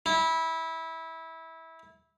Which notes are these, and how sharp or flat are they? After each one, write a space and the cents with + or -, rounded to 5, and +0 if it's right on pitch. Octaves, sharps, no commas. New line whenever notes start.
E4 -20